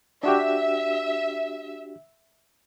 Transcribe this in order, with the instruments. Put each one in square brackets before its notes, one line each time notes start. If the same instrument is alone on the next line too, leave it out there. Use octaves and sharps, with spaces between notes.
[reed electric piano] D4 F#4 G4 [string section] E5